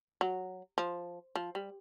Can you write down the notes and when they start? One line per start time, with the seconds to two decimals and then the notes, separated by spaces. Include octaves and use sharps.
0.21 F#3
0.78 F3
1.36 F3
1.55 G3